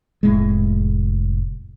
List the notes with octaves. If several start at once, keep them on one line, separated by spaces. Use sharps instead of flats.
F1 A2 G#3